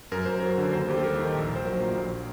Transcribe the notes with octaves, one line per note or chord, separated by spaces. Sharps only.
F#2 A#4
F#2 C5
F#3 A#4
D3
D#2 C5
D#2 G4
A4
G3 A#4
D#3
A#1
A#1
C5
F#3 A#4
A#2
A#1